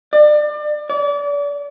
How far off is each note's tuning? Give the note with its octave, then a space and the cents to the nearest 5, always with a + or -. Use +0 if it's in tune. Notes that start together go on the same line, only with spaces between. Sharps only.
D5 +30
D5 -35